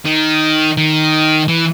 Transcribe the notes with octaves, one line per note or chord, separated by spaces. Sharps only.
D#3
D#3
E3